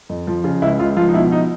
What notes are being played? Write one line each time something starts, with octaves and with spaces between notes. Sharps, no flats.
F2
F3
C#3 F4
C#2 E4
C#2 F4
F3 F4
D#4
B2 E4
D#4